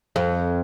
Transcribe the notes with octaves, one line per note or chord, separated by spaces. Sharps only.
F2